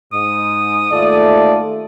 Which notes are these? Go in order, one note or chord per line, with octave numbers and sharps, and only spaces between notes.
G#2 D#6
D#2 G#2 A3 F4 A4 D5